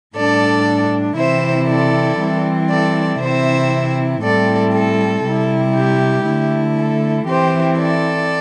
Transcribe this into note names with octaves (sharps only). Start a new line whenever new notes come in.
A2 G3 D4 A4 D5
C3 E3 C4 E4 C5 E5
A4 D5
E3 G3 C4 E4
A4 D5
C3 E3 C4 E4 C5 E5
A2 G3 C4 E4 A4 D5
A4
C3 G3 E4
G4
D3 A3 E4
A4
E3 C4 E4 G4 C5
A4 D5